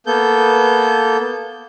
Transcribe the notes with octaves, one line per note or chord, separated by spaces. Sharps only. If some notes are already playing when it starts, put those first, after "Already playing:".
A#3 B3 A4 G6